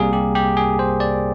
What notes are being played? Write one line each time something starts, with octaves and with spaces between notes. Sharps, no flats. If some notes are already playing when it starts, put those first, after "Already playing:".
Already playing: C2 C3 G3 A#3 G#4 A#4
G4
G4
G#4
C5
D5